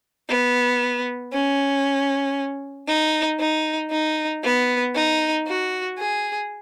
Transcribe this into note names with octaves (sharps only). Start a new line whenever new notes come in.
B3
C#4
D#4
D#4
D#4
B3
D#4
F#4
G#4